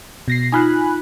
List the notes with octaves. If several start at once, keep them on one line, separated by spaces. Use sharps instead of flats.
B2 A#6 C7
D#4 F4 G#5 B5 F#6